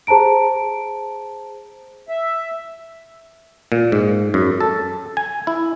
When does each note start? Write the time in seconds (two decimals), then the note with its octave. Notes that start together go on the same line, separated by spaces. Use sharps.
0.07 G#4 C5 A5 A#5 D7
2.09 E5
3.72 A#2
3.92 G#2
4.34 F#2
4.61 A4
5.17 G#5
5.47 E4